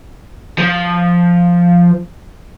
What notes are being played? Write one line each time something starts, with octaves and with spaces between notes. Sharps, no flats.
F3